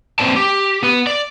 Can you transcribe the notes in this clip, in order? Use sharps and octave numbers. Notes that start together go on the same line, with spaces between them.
A#3 C4 B4 C5 D5 A5
G4
B3 B4
D5